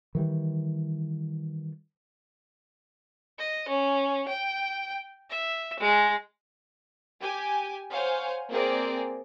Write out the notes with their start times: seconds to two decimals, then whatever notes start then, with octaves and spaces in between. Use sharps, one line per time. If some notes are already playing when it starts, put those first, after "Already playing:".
0.15 D#3 E3 G3
3.38 D#5
3.68 C#4
4.28 G5
5.30 E5
5.80 G#3
7.22 G4 G#5
7.91 C5 C#5 F5 F#5 G#5
8.49 A#3 C4 G#4 A#4 D5